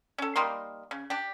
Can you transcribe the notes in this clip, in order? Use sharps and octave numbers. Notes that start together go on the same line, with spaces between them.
C#4 A4
G3 A#3 D#4 C6
C#3
D4 G4